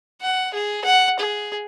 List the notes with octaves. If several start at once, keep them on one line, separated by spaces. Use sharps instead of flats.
F#5
G#4
F#5
G#4